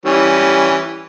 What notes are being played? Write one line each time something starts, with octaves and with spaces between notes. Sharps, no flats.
E3 G3 C#4